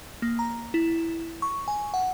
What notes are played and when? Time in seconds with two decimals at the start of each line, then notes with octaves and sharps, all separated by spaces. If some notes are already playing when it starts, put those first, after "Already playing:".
0.22 A#3
0.39 A#5
0.74 E4
1.42 C#6
1.68 G#5
1.94 F#5